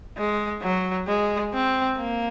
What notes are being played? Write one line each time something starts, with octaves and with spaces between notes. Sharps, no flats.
G#3
F#3
G#3
C4
A#3